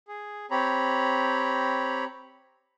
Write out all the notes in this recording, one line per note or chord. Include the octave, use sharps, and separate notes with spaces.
G#4
C4 G4 C#5 A#5 B5